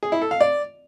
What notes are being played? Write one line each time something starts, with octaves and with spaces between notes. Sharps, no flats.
G#4
E4
A4
F5
D5